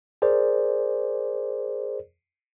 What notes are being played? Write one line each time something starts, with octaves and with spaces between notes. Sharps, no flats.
G#4 A#4 C5 D5